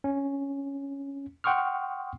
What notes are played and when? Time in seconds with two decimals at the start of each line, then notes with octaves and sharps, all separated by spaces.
0.04 C#4
1.44 F#5 G5 C6 C#6 D#6 F6